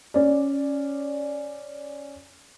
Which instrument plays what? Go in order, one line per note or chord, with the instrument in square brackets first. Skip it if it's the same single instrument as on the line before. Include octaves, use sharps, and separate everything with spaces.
[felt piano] C#4 D5